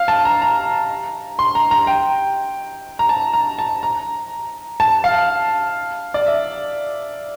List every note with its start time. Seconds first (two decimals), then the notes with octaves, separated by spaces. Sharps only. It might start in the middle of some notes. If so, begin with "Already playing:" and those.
Already playing: F5
0.08 A5
0.25 A#5
0.42 A#5
1.39 C6
1.55 A#5
1.71 A#5
1.87 G5
2.99 A#5
3.09 A5
3.34 A#5
3.59 A5
3.83 A#5
4.80 A5
5.04 F5
6.14 D5
6.26 E5